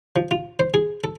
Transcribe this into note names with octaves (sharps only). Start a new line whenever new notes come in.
F3
F4
C5
G#4
A4